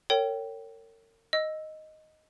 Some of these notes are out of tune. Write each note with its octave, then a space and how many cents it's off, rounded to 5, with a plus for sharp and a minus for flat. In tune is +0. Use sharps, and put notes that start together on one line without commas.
A#4 -40 C#5 +0 G5 -15
D#5 +0 E6 +0